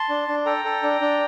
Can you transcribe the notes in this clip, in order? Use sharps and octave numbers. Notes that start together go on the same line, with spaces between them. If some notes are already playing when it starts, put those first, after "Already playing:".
Already playing: A5 C6
D4
D4
A4 G5 A#5
A4
D4
D4